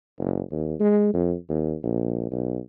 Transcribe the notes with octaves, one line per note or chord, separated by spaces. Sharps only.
F#1
D#2
G#3
F2
D#2
A#1
B1